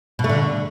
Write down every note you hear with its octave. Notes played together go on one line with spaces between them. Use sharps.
B2
A3
D3